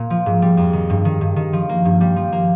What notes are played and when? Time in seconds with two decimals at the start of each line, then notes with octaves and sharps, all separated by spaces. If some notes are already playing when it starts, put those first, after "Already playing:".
Already playing: A#2 A#3
0.10 F3
0.26 G#2
0.42 G3
0.57 F2
0.73 D#3
0.90 G2
1.05 D#3
1.21 G2
1.36 D#3
1.53 F3
1.69 A#3
1.85 G2
2.01 G3
2.16 F3
2.32 A#3